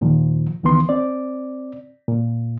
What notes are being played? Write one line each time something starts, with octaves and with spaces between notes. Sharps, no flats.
D#2 A#2 D#3 F3
C#2 D#3 E3 B3 C6
C4 D5
A#2